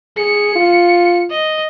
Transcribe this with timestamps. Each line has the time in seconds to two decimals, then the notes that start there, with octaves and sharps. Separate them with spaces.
0.17 G#4 C#7
0.56 F4
1.30 D#5